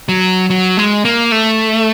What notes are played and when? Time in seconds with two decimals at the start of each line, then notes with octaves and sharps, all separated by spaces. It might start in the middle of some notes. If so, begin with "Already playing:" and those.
0.09 F#3
0.50 F#3
0.77 G#3
1.05 A#3
1.32 A3